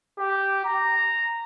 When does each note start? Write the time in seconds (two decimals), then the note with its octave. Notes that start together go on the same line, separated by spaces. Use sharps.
0.19 G4
0.65 A#5